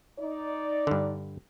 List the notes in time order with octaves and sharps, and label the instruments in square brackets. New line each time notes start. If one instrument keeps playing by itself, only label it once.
[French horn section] D#4 D5
[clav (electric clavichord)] G2 D3